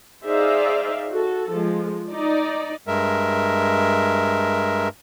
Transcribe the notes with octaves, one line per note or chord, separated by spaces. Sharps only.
D#4 G#4 C5 D5 E5 F5
F#4 A4
F3 G#3
D#4 D5
G2 G#3 A#4 E5